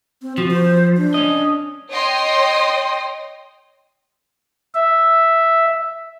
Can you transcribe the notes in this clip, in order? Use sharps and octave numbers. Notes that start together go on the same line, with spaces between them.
C4
F3 F#4
C5
D4
C#4 D#5
C#5 D#5 G5 C6 D#6
E5